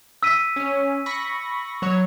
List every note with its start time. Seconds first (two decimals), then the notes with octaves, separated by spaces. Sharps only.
0.23 E6 B6 D#7
0.56 C#4
1.06 B5 C#6 A#6
1.82 F#3 C#5